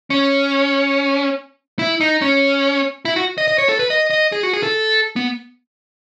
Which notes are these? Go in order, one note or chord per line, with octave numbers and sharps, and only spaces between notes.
C#4
E4
D#4
C#4
E4
F#4
D#5
D#5
C#5
A4
B4
D#5
D#5
G#4
F#4
G#4
A4
B3